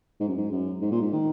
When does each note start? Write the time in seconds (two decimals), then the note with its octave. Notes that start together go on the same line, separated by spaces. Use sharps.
0.20 G#2
0.28 F#2
0.37 G#2
0.51 F#2
0.81 G#2
0.91 A#2
1.01 G#2
1.12 D#3